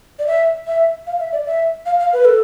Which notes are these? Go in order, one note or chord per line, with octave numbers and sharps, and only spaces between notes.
D5
E5
E5
F5
E5
D5
E5
F5
F5
B4
A4